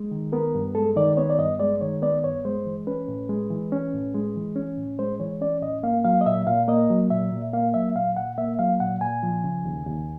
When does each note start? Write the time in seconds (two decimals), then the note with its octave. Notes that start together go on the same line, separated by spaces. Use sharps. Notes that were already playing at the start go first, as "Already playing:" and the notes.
Already playing: G#3
0.11 D#3
0.32 B3 A#4
0.55 G2
0.75 G#3 A4
0.96 D#3 D5
1.17 B3 C#5
1.30 D5
1.39 G2 D#5
1.59 G#3 D5
1.81 D#3 C#5
2.02 B3 D5
2.24 G2 C#5
2.45 G#3 C5
2.66 E3
2.87 C#4 B4
3.08 A2
3.29 G#3
3.51 E3
3.72 C#4
3.93 A2
4.14 G#3
4.36 E3
4.56 C#4
4.78 A2
4.99 G#3 C5
5.20 E3 C#5
5.41 C#4 D5
5.62 A2 D#5
5.83 A#3 F5
6.05 F#3 F5
6.21 D#5
6.26 A#2 E5
6.47 A#2 F5
6.68 A#3 D#5
6.90 F#3
7.10 A#2 E5
7.32 A#2
7.53 A#3 F5
7.74 F#3 E5
7.95 A#2 F5
8.17 A#2 F#5
8.38 A#3 E5
8.59 F#3 F5
8.80 A#2 F#5
9.01 A#2 G#5
9.23 F3
9.44 C#3
9.65 D#2
9.86 D#2